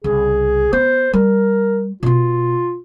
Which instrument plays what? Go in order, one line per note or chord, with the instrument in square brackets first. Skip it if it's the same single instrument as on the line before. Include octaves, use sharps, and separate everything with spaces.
[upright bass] C2 C#3 [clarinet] G#4
[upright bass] B3 [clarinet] C5
[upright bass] G3 [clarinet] A#4
[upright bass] B2 B3 [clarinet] F4